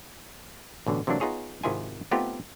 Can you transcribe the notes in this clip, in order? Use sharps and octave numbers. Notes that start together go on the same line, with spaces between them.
A1 B2 D3
C3 E3 F#3 A#3 D4
B3 D#4 F4 G#4 C#5
G#1 C3 D#3 E4 F4 G#5
A3 B3 C4 D#4 F4 G4